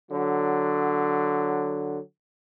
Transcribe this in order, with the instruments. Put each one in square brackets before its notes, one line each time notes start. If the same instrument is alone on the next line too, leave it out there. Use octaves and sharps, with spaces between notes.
[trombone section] D3 F#3